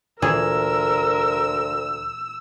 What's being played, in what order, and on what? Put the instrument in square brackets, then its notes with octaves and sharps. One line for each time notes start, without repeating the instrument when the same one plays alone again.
[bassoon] D2 [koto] A#2 E3 G#4 [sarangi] A#4 [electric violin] E6